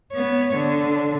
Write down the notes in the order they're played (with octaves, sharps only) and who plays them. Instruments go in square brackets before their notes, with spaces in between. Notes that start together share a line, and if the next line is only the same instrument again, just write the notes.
[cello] B3 C#5
D3